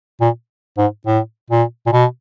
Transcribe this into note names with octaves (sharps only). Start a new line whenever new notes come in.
A#2
G#2
A2
A#2
A#2
B2